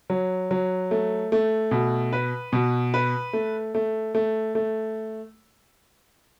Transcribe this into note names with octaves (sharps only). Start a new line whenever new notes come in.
F#3
F#3
A3
A3
B2
B4
B2
B4
A3
A3
A3
A3